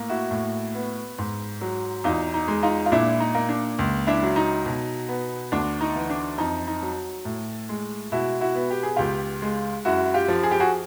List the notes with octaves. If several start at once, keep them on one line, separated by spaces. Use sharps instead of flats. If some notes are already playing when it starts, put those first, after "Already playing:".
Already playing: A2 A#3
E4 F#4
A2
B3
G#2
F#3
E2 D#4 F4
D#4
G#3
D#4 F4
F4
A#2 D4 E4
D#4
A#3
D4
C#2
D4 E4
F#3
D#4
B2
B3
D2 D4
D#4
E3
D4
F2 D#4
D#4
F#3
A2
G#3
B2 E4 F#4
E4 F#4
B3
G4
G#4
C#2 F4 G4
G#3
F#2 E4 F#4
F4 G4
F3
G#4
G4
F#4 G#4